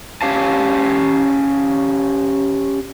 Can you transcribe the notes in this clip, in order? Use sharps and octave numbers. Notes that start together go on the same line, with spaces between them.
C#4 G4 F5 A5